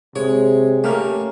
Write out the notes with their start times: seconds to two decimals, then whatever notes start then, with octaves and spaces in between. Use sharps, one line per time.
0.16 C3 G#3 C#5
0.84 A3 A#3 C#4 G4 F6